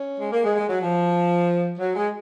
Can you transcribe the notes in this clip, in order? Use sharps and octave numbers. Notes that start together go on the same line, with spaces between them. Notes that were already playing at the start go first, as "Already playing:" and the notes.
Already playing: C#4
G#3
A#3
G#3
G#3
F#3
F3
F#3
G#3